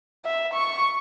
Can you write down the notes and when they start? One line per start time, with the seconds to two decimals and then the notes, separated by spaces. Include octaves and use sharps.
0.25 E5
0.54 C#6